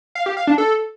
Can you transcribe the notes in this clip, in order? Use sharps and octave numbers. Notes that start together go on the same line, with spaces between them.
F5
G4
F5
D4
A4